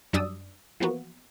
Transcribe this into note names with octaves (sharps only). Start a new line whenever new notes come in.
F#2 G3 D4 D5 D#6 E6
E3 F3 A#3 B3 F#4